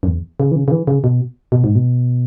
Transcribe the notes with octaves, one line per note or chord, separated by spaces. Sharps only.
F#2
E2
C#3
E3
C#3
C#3
E3
C#3
B2
B2
G#2
B2